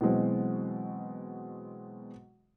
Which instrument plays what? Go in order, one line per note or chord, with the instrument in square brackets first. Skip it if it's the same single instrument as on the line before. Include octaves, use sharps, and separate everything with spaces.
[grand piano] B2 E3 F#3 G#3 C4